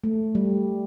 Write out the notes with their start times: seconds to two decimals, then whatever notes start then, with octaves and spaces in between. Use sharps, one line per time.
0.04 A3
0.35 G3